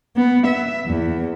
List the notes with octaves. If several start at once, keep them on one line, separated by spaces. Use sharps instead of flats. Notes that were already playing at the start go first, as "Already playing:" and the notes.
B3
E5
E2